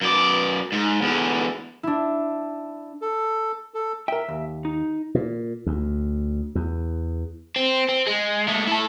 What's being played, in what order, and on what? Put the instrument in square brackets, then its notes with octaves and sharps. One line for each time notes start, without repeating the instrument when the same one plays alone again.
[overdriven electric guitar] F#2 D5
G#2
E2 D3
[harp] D4 E4
[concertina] A4
A4
[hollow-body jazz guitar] A#4 G5 [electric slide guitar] E5
[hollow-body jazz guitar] D#2
[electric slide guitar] D#4
[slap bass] A#2
D2
E2
[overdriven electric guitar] C4
C4
G#3
G#3 A3
E4 A4